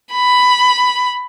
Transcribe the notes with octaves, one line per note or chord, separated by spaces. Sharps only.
B5